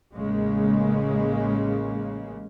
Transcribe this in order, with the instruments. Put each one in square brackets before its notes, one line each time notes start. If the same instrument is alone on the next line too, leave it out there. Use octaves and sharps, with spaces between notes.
[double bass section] A1 C#3 G#3 A#3